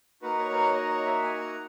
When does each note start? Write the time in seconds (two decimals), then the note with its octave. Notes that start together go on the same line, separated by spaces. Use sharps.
0.22 A#3 D#4 F#4 B4
0.39 C#5
0.51 B4
0.56 C#5
0.73 D#5
0.89 C#5
1.06 E5
1.23 G#5
1.39 A#5